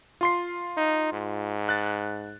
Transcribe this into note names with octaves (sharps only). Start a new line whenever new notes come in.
F4 C6 C7
D#4
G#2
F#6 A6